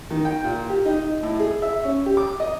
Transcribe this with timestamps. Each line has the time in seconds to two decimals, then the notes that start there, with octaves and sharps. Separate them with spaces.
0.11 D#3
0.25 G5
0.44 A#2
0.70 G4
0.86 D#4
1.23 A2
1.40 G#4
1.62 E5
1.84 C#4
2.06 G4
2.17 D6
2.40 D#5